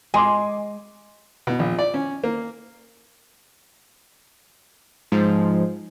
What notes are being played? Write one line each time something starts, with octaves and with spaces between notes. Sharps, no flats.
G#3 G#5 C6 D6
B2
A#1
D5
C#4
A#3
G#2 F3